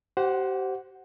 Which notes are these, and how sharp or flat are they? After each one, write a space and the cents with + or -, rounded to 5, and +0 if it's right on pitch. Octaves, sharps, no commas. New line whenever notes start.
G4 -35 C5 +0 F#5 +0